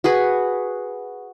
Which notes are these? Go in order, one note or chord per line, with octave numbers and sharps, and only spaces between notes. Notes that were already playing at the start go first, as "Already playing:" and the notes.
F#4 G#4 B4